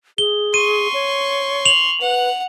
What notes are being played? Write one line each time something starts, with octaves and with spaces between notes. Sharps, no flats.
G#4 G7
C6 C#6 D#7
C#5
F7 F#7
B4 F#5